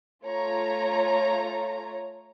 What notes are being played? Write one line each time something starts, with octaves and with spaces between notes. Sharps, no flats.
A3 F4 C#5 A#5